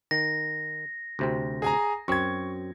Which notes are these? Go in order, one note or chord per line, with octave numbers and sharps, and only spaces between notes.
D#3 A#6
D2 C3 C4
G#4 G#5 A#5
F#2 C4 C#6 G#6